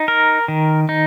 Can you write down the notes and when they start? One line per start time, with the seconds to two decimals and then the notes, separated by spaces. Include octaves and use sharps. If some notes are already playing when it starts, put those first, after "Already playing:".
Already playing: D#4
0.08 A#4
0.48 D#3
0.89 D#4